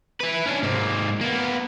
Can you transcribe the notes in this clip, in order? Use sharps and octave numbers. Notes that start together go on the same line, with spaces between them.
E4 B4
C#4 D4
G#2 A#3
A#3 B3